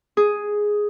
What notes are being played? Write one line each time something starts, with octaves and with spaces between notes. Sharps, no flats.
G#4